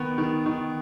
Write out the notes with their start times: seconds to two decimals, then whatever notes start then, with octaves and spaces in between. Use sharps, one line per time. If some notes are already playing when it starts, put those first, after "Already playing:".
Already playing: D#3 B3
0.18 D#3
0.46 D#3